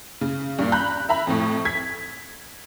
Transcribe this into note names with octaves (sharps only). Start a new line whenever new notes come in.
C#3
G2 A#2
A#5 B5 F#6 G6
E5 A#5 B5
F2 A2
G#6 B6